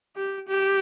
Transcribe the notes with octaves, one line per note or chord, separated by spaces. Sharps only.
G4
G4